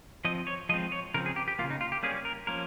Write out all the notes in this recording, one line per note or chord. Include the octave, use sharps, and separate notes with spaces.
F3 C4 D#5
C#5
F3 G#3 C4 D#5
C#5
C#3 F3 C4 A#4
G#4
G4
G4
C#3 F3 A#3 F4
D#4
F4
G4
G3 A#3 C#4 G#4
A#4
F3 A#3 C#4 A#4